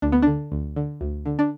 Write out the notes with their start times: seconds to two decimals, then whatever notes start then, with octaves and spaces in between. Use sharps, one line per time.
0.02 D2 D4
0.12 B3
0.22 D3 D4
0.52 D2
0.76 D3
1.01 D2
1.26 D3
1.39 D4